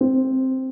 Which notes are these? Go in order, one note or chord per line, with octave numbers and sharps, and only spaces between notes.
C4